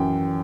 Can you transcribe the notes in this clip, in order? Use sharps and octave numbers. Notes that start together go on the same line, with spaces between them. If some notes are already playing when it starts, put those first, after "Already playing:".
Already playing: F#2 E3 G5